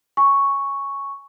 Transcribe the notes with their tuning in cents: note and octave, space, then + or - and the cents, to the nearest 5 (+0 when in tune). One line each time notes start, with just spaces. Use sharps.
G#5 +0 C#6 +0